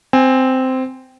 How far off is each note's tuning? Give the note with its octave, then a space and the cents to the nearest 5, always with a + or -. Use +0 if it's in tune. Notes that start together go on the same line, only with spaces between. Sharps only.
C4 -10 G#5 -20